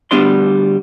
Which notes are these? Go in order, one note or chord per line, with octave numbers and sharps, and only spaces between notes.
D2 G3 B3 D4 D5 C6